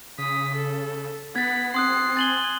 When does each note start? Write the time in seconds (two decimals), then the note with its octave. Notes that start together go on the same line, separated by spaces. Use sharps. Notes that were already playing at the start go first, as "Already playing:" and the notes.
0.19 C#3 D#6 B6
0.55 A4
1.36 B3 F#5 G#6 A6 B6
1.74 C4 C6 D#6 F#6 C7
2.17 G#5 A6 F#7 G7